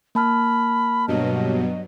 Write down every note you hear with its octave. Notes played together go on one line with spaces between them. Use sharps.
A#3 A5 B5 F6
G2 B2 F#3 D#5